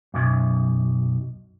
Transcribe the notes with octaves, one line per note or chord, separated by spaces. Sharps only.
B1 F#2